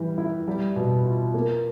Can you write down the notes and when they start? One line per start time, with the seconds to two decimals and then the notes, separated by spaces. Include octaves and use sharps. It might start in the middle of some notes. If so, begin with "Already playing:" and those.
Already playing: E3 G3
0.18 E4
0.48 G3
0.76 B2
1.05 F4
1.34 A#3